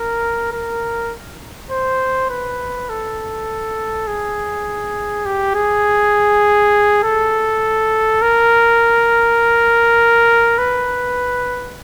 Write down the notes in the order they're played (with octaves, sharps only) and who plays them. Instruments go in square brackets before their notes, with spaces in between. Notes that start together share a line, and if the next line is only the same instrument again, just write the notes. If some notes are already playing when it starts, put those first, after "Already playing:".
Already playing: [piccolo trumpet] A#4
A#4
C5
B4
A4
G#4
G4
G#4
A4
A#4
B4